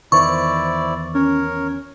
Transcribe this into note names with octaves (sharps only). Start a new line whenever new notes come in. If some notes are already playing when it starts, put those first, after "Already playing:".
E2 D#3 E3 E4 C5 D5 C#6
C#4 A#4 C#5